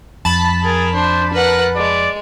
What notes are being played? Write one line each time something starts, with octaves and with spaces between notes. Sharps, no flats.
F2 A5 B5
G#4 A#4
D4 C5
A#4 B4 F#5
G#3 D5